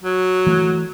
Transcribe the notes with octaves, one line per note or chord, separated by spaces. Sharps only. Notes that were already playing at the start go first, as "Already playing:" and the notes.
F#3
E3 A3